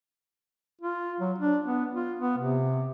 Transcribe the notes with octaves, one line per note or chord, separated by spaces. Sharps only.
F4
F#3
D4
B3
F4
B3
C3